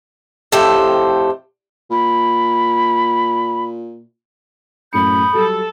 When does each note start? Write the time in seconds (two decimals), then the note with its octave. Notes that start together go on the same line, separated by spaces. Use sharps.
0.52 F2 A2 G4 A4 C5
1.91 A#2 B5
4.93 F#2 A2 B5 D#6 G6 C#7
5.34 F#3 G3 A4